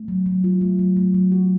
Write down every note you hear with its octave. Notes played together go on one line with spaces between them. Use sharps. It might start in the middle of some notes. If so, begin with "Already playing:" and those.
Already playing: A3
F#3
F#3
F4
A3
F#3
A3
F#3
F#4